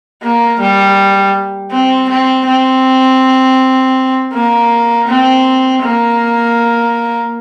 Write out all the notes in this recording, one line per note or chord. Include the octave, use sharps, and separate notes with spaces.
A#3
G3
C4
C4
C4
A#3
C4
A#3